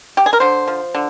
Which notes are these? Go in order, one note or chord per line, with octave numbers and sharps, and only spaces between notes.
G4
G#4
A#4
D3 C5
F3
D3